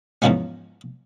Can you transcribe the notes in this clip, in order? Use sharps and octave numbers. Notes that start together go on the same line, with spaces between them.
E2 G#2 C#3 F3 G#3 C#4